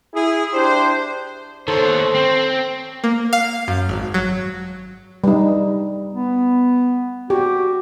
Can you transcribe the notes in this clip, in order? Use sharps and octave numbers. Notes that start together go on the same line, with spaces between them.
E4 G#4
D4 E4 G4 C5
D#3 A4 C5 C#5
C4
A#3
F5
F#2
G#1
F#3
G3 D#4
B3
F#4 G4